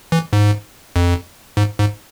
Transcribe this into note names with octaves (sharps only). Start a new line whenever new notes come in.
E3
G#2
F2
G#2
G#2